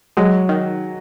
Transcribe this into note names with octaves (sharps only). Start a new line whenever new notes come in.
F#3 G#3
D#3